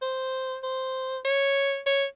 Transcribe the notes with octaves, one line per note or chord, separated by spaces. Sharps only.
C5
C5
C#5
C#5